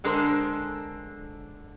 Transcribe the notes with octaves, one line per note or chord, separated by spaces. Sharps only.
D3 G#3 D4 A4 A#4 C5